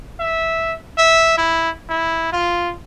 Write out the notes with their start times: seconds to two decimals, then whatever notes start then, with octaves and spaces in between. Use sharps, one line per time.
0.20 E5
0.98 E5
1.38 E4
1.89 E4
2.32 F4